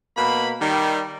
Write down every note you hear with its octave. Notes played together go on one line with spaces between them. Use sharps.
B2 A#3 B5
D#3 G3